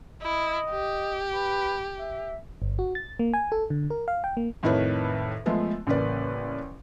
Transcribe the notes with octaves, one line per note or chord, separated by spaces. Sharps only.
E4 D#5
G4
B4
E5
G1
F#4
A6
A#3
G#5
A4
D3
A#4
F5
G5
A#3
F2 A2 D#3 E4 B4 C#5
F3 G#3 A3 B3
A1 C#3 A#3 B4 D5